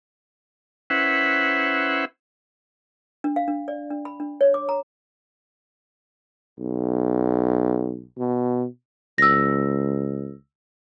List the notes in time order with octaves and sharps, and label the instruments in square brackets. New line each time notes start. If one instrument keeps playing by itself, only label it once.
[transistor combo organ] C#4 E4 B4 C5 E5 F#5
[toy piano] D4
F5
D4
D5
D4
B5
D4
C#5
D6
A#5
[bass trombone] B1
B2
[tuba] C#2 [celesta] E6 A#6